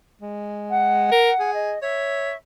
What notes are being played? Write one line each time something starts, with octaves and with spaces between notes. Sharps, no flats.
G#3
F#5
A#4
G#4
D#5
C#5 E5